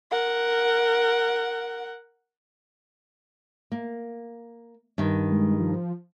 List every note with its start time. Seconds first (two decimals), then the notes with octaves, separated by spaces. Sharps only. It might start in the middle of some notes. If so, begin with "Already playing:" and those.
0.11 A#4 F#5
3.72 A#3
4.98 G2 D#3
5.32 G#3
5.60 F3